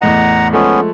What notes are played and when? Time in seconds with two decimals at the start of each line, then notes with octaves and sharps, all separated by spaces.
0.02 E2 A2 D#5 F#5 A#5
0.53 F3 G#3 A3 B3 C#4